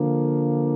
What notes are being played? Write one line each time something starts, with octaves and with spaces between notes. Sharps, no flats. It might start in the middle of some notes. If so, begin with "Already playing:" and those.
Already playing: D3 F3 A#3